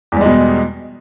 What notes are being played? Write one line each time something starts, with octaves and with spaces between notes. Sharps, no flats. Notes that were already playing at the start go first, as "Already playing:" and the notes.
E2 B2 G3 G#3